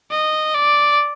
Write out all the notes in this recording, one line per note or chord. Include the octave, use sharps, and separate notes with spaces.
D#5
D5